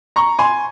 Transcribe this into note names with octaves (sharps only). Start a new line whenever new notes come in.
A#5 C#6
G#5 C6